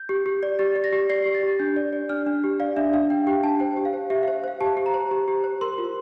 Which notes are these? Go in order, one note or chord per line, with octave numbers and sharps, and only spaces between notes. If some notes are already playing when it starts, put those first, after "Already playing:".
Already playing: G6
G4
G4
D5
G4 A6
D5
A#6
G4
D5 C7
G4
A6
G4
D4 G6
D5
D5
D4 F6
D4
G4
D5 F5
D4 E5
D4 F5
D4 G5
G4 G5
D4 A5
C5 G5
G4
F5
C5
G4 E5
C5 F5
C5 F5
G4 A5
G4
A#5
C5
G4
G4
C5
A#4 C6
F4